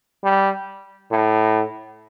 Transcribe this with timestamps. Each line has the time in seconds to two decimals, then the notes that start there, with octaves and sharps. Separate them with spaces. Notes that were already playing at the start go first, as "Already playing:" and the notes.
0.24 G3
1.11 A2